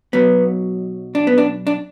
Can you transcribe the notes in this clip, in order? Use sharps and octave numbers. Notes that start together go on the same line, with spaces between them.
B1 B2 F#3 B3
D4
B3
D4
D4